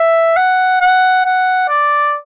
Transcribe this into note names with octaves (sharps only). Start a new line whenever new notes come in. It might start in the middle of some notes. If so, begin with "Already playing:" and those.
Already playing: E5
F#5
F#5
F#5
D5